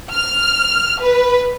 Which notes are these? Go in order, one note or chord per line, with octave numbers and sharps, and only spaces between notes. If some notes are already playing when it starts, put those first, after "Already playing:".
F6
B4